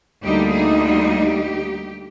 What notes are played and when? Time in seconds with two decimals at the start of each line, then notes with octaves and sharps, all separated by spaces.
0.22 D2 D3 G3 A#3 D#4 G4
0.53 G#4
0.81 F4
1.10 G4